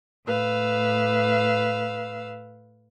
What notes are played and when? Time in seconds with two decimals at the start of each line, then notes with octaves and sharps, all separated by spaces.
0.25 A2 B4 F5 E6